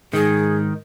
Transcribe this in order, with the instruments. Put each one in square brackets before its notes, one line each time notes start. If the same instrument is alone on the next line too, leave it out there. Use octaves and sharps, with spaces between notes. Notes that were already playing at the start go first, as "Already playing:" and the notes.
[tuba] G#2 [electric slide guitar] D#3 [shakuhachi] G#4